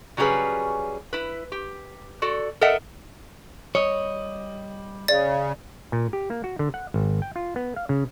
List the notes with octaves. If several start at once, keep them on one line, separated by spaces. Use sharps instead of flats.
C#3 F#3 G3 C#4 G#4 B4
E4 B4
G4
F#4 A4 D5
A4 A#4 D#5 E5 F#5
G3 C#5 D#5
C#3 D5 A6
A#2
G4
A#3
F#4
D3
F#5
G#1
G5
F4
B3
F5
C#3